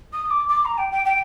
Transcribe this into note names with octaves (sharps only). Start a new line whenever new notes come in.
D#6
D6
D6
A#5
G5
G5
G5